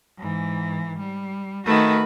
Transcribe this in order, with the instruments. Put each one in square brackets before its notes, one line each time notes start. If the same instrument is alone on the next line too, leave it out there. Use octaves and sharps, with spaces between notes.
[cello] G#2 E3
G3
[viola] D#3 A3 [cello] F#4 B4